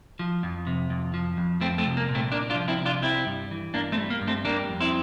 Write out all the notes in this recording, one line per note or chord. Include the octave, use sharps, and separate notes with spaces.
F3
F2
C3
F2
F3
F2
F3 A3 C4
A3 C4
C2
A#3
A#2
A3 C4
C2 A#3 D4
D4 F4
F3
C4 E4
C2
D4 F4
G3 C4 E4
G2
E3
G2 A#3 D4
A3 C4
G3
A#3
G2
A3 C4
G3 A#3 D4
F2
C4 E4